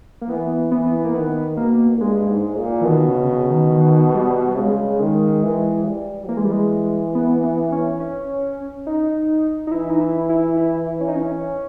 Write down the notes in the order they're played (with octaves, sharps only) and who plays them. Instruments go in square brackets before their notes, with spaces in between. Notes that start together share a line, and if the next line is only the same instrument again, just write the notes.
[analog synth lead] A#3
[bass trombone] E3 [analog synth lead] B3
[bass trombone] E3 [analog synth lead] B3
[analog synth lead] A#3
[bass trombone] D#3 [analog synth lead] B3
[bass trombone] B2 [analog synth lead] A#3
[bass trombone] G2 [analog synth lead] G#3
[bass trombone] G#2
A#2
[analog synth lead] E3
[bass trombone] B2 [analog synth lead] D#3
[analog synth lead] C#3
C#3
D#3
D#3
G3
G3
[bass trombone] C#3 [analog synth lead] G#3
[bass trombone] D#3
E3
G3
[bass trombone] E3 [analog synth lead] A#3
[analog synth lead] G#3
G3
G#3
B3
B3
C#4
C#4
D#4
D#4
[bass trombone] E3 [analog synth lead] E4
[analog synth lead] D#4
E4
E4
E4
C#4
D#4
C#4